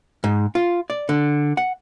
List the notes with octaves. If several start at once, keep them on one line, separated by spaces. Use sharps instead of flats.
G#2
F4
D5
D3
F#5